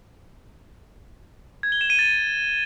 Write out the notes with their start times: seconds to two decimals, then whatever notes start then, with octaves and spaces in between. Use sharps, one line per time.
1.63 G#6
1.72 G7
1.81 E7
1.90 D#7
1.99 A6